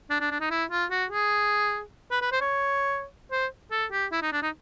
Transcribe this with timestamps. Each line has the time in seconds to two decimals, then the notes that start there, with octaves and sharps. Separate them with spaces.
0.10 D4
0.21 D4
0.31 D4
0.41 D#4
0.51 E4
0.71 F4
0.91 F#4
1.11 G#4
2.11 B4
2.22 B4
2.32 C5
2.41 C#5
3.32 C5
3.71 A4
3.92 G4
4.12 E4
4.22 D#4
4.33 D4
4.42 D#4